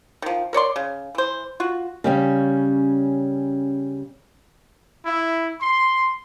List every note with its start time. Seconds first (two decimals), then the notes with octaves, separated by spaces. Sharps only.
0.22 D#3 F3
0.53 A#4 C#5 D5 C6
0.76 C#3
1.15 E3 C5
1.60 F4 F#4
2.04 C#3 G3 C#4
5.05 E4
5.61 C6